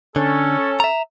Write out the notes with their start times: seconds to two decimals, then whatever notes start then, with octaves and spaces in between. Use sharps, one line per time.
0.16 D3 C#4 A4
0.80 E5 A#5